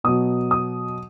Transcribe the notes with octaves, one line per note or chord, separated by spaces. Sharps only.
B2 F#3 D#6
D#6